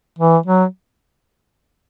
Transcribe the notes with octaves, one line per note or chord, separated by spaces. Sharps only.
E3
F#3